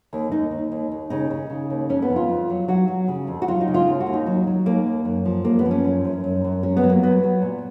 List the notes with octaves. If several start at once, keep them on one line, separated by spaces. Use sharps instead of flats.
D#2
D#2 D#4
D#2
D#2
D#2
C#3 D#4
C#3
C#3
D#2
F2 C#4
B3
F2
F4
F2
F#3
F#3 F#4
F#3
C#3
F2
F#4
F#3 F4
D#4
C#3
F4
D#2
F#4
D#2
D#4
F#3
F#3
D#2 A#3
D#2
F#2
F3
F#2 A#3
B3
F3
C#4
F#2
F#2
F#2
F#2
F#3 C#4
B3
F#3
A#3
F#3 B3
F#3
A#2